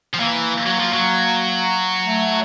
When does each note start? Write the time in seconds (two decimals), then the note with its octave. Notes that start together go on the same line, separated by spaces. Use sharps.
0.14 F3
0.20 E3 A#3
0.66 F#3
0.79 F3
0.93 F#3
2.07 A3